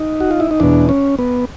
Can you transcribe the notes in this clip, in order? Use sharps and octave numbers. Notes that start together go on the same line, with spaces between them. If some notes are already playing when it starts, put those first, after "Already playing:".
Already playing: D#4
F#4
F4
E4
D#4
E2 B2 D4
C#4
B3